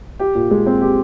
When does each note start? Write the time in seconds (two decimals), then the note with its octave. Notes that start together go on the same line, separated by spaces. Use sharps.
0.20 G4
0.35 A#2
0.51 G#3
0.66 C4
0.81 G4